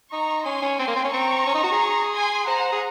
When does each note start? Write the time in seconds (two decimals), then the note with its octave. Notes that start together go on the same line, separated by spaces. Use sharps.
0.11 D#4 A#5 C#6
0.45 C#4 G#5 C6
0.63 C#4
0.79 C4 G#5 C6
0.88 A#3
0.96 C4
1.05 C#4
1.12 C4 A#5 C#6
1.46 C#4
1.55 D#4
1.63 F#4
1.72 G#4
2.13 G#5 C6
2.47 C5 F#5 A#5
2.72 G#4